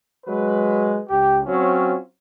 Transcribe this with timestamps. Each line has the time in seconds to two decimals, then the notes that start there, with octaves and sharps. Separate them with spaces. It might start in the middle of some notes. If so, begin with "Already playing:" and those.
0.24 F#3 G#3 B4
1.08 C#2 G4
1.44 F#3 C4 C#4 F4